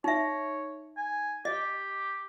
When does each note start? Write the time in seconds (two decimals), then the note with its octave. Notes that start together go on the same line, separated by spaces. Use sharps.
0.04 D#4 C#5 E5
0.97 G#5
1.45 G4 D#5